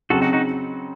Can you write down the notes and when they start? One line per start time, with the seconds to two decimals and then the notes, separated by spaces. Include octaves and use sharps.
0.10 C#3 F#3 C4 F#4 A4
0.21 D#4 F#4
0.33 D#4 F#4